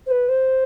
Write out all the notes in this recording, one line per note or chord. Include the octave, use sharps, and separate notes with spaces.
C5
B4
C5